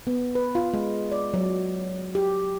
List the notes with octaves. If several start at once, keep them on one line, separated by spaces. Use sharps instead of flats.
B3
B4
F4
G#3
D5
F#3
G4